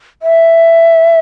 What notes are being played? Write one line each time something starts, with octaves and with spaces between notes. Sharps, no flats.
E5